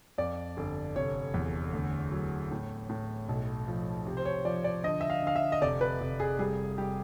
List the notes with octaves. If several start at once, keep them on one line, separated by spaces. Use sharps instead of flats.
F2 D5
G1
F1 C#5
E2
D2
F#3
A2
A2
B1
F3
C3
C5
C#5
F3 D5
D5
D3 D#5
E5
F5
D3 F5
E5
D#5
F1 D5
B4
F1
G#4
G3 G#4
G3 G4